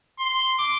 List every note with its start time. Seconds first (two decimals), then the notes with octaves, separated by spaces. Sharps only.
0.20 C6
0.58 D6